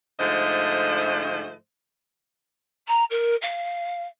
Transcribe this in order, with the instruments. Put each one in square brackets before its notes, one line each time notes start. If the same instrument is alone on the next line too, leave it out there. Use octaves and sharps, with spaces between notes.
[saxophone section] G#2 D3 F3 A3 C5 D#5
[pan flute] A#5
A#4
F5